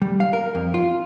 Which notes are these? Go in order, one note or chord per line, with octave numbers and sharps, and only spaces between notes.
G3
F5
A#4
F2
F4